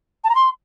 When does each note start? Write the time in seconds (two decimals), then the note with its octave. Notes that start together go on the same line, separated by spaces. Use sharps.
0.24 A5
0.29 A#5
0.35 C6